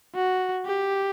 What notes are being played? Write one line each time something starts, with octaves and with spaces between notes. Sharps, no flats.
F#4
G4